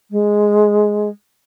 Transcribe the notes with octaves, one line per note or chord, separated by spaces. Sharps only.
G#3